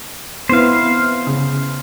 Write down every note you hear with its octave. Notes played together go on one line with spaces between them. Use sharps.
B3 C4 E4 C5 F5
C#3